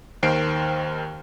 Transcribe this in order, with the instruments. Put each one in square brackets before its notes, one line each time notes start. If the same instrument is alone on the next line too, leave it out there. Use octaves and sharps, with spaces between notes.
[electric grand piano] D#2 D#3 C5 C7 D7